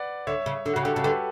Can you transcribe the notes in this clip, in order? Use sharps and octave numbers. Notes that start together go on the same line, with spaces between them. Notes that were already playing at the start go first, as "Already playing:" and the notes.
Already playing: B4 D5 F#5
D3 C#5 E5
C#3
D3
C#3 F#4
D3 G4
C#3 A4
D3 G4 B4